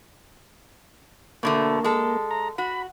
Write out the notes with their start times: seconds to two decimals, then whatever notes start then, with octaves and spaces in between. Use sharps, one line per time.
1.43 B2 D3 A3 A#3
1.84 G#3 A4
2.31 A#5
2.58 F#4 B5